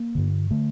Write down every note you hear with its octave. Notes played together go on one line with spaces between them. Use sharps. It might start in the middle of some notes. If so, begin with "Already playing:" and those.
Already playing: A#3
G2 D3
D3 A3